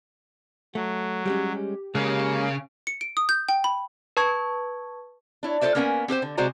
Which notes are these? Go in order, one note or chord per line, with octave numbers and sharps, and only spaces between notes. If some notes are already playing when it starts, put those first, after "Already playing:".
F#3 A3
G3 G#3 C#4 G4
C#3 G#3 A#3
C#7
D7
D#6
G6
G5
B5
B4 A5 C#6 G#6
D4 E4 C#5
F4 A4 B4 C5 D5 E5
A#3 B3 C#4 A#4 E5 G#5
C4 G4 B4 C5
D3
C3 G#3 F#4 C5 D5 A#5